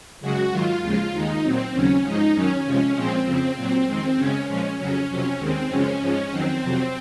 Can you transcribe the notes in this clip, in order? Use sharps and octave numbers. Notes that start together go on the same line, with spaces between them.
F#2 C#3 G#3 F#4
G#2 D#3 F#3 F4
D#2 C#3 F3 G#3 F4
D#2 D#3 G#3 D#4
A#2 F#3 C4
D#2 C#3 F#3 C#4
G#2 F3 G#3 D#4
F#2 D#3 F#3 C#4
F2 C3 F3 G#3
A#2 F3 G#3 C4
F2 C#3 F3 C4
A#2 F#3 C4
F2 D#3 G#3 C4
F#2 C#3 G#3 C#4
A#2 F3 G#3 C#4
F2 C#3 F#3 C#4
F2 C3 F#3 C#4
D#2 D#3 G#3 C4
F#2 C#3 F3 G#3 C#4
G#2 F3 G#3
F2 D#3 F#3 C4
F2 C3 F#3